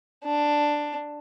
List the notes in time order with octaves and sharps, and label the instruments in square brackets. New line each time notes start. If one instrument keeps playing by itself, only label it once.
[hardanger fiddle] D4